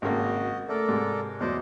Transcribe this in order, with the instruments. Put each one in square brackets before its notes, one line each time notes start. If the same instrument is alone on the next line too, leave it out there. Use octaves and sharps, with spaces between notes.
[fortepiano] G#1 C#3 A#3 [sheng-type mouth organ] F#4 D#5
[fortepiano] A3 [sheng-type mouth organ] A4 A#4 D5
[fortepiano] G#2 C3
[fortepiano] E2 F#3 [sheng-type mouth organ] C5 D5 D#5